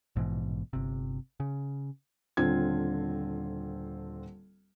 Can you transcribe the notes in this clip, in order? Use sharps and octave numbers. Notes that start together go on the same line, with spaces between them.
A#1 G#2 B2 E3
G1 C3
C#3
D#1 D3 C4 F4 G#6